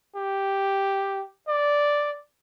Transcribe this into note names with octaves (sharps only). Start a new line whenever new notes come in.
G4
D5